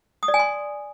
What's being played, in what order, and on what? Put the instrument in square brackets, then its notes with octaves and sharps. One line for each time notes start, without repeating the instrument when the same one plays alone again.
[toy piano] D#6
D5
G#5
C6